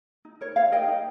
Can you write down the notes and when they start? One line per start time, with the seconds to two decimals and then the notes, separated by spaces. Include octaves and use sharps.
0.25 D#4
0.41 A#4 C#5
0.56 D#4 C#5 F5
0.72 A#4 D#5 G5
0.88 D#4